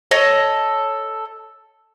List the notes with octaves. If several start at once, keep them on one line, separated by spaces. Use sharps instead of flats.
A4 C#5 D#5